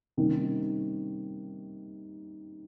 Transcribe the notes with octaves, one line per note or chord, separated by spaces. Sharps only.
C3 D#3 G3 A#3 C#4